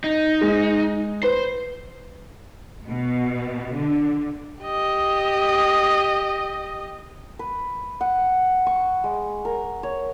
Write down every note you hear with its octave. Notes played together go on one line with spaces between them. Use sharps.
D#4
G#3
B4 C5
B2
D3
G4 D#5
B4
F#5
C#6
G#3
A#4
C#5